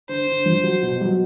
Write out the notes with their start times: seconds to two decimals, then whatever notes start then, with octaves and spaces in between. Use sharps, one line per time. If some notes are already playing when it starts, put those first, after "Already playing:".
0.09 D3 C5
0.27 D3
0.46 F3
0.63 F#3
0.83 B2
1.01 F#3